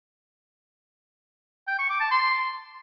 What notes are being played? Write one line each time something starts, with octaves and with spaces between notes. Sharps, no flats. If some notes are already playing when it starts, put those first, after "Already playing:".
G5
C#6
D6
A5
C6